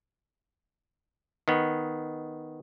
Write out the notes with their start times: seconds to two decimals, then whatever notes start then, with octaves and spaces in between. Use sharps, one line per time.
1.48 D#3 B3